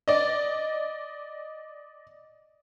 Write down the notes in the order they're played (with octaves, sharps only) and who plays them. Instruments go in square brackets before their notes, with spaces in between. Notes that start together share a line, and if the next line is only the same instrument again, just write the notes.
[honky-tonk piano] D5 D#5